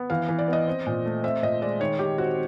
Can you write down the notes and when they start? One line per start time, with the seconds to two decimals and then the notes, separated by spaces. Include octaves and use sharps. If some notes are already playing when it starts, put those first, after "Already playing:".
Already playing: B3
0.10 E3 F5
0.29 E3
0.39 D5
0.48 B3
0.53 D#5
0.67 C4
0.87 A#2
1.05 A3
1.24 C4 E5
1.43 A#2 D#5
1.61 G#3 D5
1.80 D#3 C#5
1.99 D#3 G4
2.18 C4 F#4